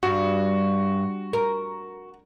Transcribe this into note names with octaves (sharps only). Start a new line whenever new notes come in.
G2 F#4
A#4